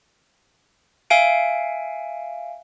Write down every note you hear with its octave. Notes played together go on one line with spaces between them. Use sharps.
E5 F5 G#5 D7